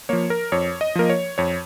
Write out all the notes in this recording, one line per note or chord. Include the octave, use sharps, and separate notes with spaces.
F3 A#3 C#5
A#4
F2 C#5
D#5
F3 A#3 A#4
C#5
F2 C#5